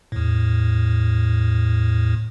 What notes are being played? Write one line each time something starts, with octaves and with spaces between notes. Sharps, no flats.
E2 A2